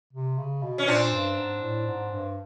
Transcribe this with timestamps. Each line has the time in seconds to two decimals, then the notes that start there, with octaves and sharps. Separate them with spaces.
0.13 C3
0.38 C#3
0.62 B2
0.78 C#4
0.87 A#2 C4 D4
1.12 G2
1.37 G#2
1.62 A2
1.86 G#2
2.11 G2